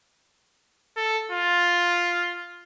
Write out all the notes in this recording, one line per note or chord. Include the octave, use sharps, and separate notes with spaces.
A4
F4